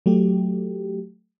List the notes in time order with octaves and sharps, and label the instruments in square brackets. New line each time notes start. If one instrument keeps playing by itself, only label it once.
[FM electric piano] F#3 A3 G4